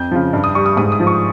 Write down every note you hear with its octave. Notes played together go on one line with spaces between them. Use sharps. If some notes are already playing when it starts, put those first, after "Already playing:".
Already playing: F2 G6
C#3 F3
G2
D#6
G3 C#6
D#6
G#2 D#6
D#6
F3
C#6